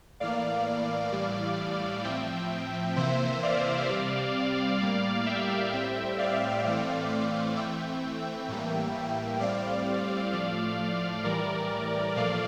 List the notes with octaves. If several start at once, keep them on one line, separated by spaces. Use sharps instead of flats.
A2 E3 A#3 D5 F5
A2 E3 G3
A2 F3 C4 E5 G5
C3 E3 A#3 C5 E5
D5 F5
C3 G3 C4
A2 G3 A#3
E5 G5
A2 G3 C4
D5 F5
A2 E3 A3 C4
D5 F5
E3 A3 C4 E5 G5
A2 E3 G3 A#3
A2 G3 C4 D5 F5
A2 F3 A3 D5 F5
A2 E3 G3 A#4 D5
A#2 F3 A3 D5 F5